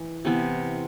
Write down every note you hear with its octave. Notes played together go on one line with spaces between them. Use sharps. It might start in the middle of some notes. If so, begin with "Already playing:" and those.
Already playing: E3
C3 E3 B3